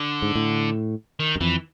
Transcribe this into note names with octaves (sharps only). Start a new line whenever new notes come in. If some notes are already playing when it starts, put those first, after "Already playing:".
Already playing: D3
G#2
A2
D#3
F#2
F2 E3